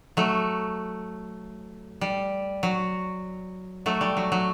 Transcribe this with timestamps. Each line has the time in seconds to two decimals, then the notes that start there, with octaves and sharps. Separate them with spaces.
0.17 F#3 A3
2.01 G3
2.63 F#3
3.86 F#3 A3
4.01 G3
4.17 F#3
4.32 F#3